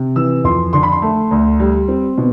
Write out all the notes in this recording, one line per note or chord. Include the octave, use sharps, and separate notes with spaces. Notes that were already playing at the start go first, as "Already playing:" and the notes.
Already playing: C3
E3 E6
F2 C6
D3 C6
B5
C6
A3
D2
G3
C4
B2